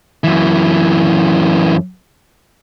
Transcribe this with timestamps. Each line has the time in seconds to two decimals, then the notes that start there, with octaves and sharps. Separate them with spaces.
0.24 F#2 E3